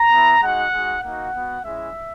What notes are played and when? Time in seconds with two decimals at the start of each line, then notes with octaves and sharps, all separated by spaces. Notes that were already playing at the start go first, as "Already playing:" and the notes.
Already playing: A#5
0.12 B3 E4
0.42 G#3 D#4 F#4 F#5
0.73 G#3 D#4 F#4
1.03 A#3 D#4 F#4 F#5
1.34 B3 F#4
1.64 G#3 C#4 E4 E5